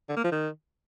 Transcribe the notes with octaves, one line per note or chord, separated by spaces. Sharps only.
D3
A#3
F3
D#3